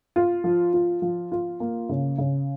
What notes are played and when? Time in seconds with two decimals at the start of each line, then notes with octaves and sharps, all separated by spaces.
0.16 F4
0.44 F3
0.73 F4
1.02 F3
1.32 F4
1.60 A#3
1.89 C#3
2.18 C#3